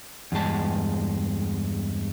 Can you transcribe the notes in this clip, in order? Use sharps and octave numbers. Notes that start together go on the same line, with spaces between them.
E2 G2 G#3 A5